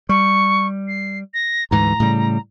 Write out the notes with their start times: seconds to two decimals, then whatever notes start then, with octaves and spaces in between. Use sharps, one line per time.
0.09 G3 C#6
0.88 C7
1.34 A#6
1.71 D2 G#2 E3 A#5
2.00 A2 C#3 G3